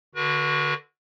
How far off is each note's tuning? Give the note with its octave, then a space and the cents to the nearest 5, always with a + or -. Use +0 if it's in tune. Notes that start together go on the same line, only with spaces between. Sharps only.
D3 +0 F#4 +0 B4 -40